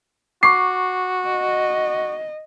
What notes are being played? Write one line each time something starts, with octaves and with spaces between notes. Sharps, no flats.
F#4 C#6 D6 C7
D#5